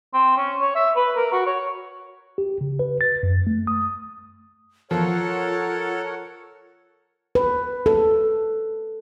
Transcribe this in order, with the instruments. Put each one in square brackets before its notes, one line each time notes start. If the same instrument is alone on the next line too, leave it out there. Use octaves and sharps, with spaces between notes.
[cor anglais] C4
C#4
C#5
E5
B4
A#4
F#4
C#5
[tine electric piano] G4
C#3
B4
A6
F#2
A3
D#6
[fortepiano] F3 [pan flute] F4 [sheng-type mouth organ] A4 [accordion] A#4 C#5 F#5
[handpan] B4
A4